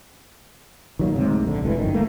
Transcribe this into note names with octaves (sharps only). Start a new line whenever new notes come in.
D#3 F#3 A#3
D2 G#2 C3
A#1 D3
E1 D2 D#3 E3
G1 F#2 D#3
A3 A#3